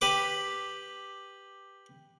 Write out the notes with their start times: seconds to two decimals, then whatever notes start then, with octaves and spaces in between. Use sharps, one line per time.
0.01 G4 B4 D6